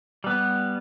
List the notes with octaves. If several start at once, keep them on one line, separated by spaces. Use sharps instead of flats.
G3 B3